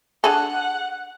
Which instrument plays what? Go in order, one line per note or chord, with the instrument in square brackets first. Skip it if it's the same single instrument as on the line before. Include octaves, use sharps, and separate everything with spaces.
[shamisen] D4 G#4 A4 [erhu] F#5